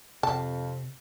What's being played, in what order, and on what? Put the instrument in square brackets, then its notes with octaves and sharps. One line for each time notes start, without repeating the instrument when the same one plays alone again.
[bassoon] F2 [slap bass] C3 [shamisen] A5